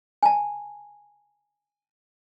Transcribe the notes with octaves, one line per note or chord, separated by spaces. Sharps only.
G#5 A5